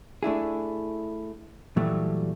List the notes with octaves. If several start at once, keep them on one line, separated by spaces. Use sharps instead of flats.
A3 D4 E4 G#4
A#2 E3 F#3 G3 A3